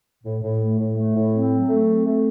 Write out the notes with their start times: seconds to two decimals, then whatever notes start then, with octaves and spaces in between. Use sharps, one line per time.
0.23 A2
0.41 A2
0.59 A3
0.78 A2
0.97 A3
1.14 A2
1.32 C4
1.51 F#3
1.68 A3
1.88 C4
2.05 A3